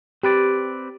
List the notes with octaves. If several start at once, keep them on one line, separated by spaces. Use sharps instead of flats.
C4 G4 B4 D5